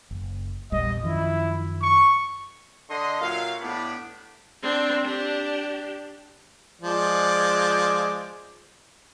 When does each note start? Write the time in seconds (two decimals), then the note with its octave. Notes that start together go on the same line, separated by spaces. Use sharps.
0.11 F#1
0.72 A#1 E2 G3 D#5
1.04 F#2 D#3 F3 E4
1.82 C#6
2.89 D3 D#5 C6
3.20 A#2 F#3 E5 F5
3.60 A2 B3 D4 G4 B5
4.63 C4 D4
5.05 D4 G4
6.82 F3 G#3 D5